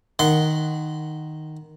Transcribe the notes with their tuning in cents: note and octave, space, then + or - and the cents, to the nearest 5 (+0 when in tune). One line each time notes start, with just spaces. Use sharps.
D#3 -5 F#5 +0 C6 -25